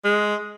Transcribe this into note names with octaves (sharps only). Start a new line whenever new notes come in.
G#3